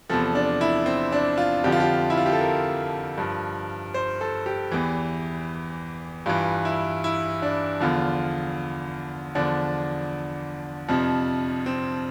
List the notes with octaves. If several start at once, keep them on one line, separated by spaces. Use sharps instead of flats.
E2 C3 F3 A4
D4
E4
C4
D4
F4
F2 D3 F3 G4
F4
G4
E4
F4
G4
A4
A#4
G2 F3
C5
A4
G4
E2 E3
G2 E3 F4
E4
E4
D4
E2 D3 F3 F4
E2 D3 F3 D4
F2 C3 F3
C4